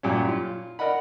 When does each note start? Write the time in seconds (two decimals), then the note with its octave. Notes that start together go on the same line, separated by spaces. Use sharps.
0.03 F#2 A#2 G3 C#4
0.28 F4
0.79 A#4 D5 D#5 F#5 B5